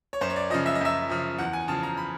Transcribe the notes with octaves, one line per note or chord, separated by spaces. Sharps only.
C#5
F#2 C5
C#5
D5
C#3 F3 D#5
E5
D#5
F#2 E5
C#3 F3
E2 F#5
G#5
C#3 F3 A5
A#5
B5